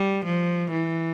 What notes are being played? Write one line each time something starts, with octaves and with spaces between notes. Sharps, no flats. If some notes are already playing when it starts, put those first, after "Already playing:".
Already playing: G3
F3
E3